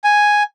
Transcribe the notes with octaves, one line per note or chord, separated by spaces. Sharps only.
G#5